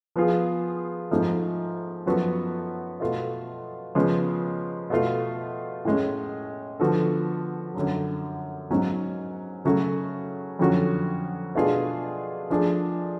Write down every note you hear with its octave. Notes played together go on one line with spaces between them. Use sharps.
F3 B3 F4 G#4
G#2 F3 A3
F#2 F3 B3 F#4 A4
B2 A3 F4
C#3 F3 G#3 B3
B2 A3 F4
A2 G#3 C#4
D3 F3 B3 F#4 A4
F#2 D3 F#3
G#2 F#3 C#4
C#3 F#3 A3 C#4 F#4
F2 D3 F#3 C#4 F#4
B2 A3 D4 F4 G#4
F3 A3 D4 G#4